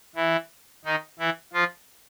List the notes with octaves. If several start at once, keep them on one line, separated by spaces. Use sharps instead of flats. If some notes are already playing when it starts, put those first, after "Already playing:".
E3 E4
D#3 D#4
E3 E4
F3 F4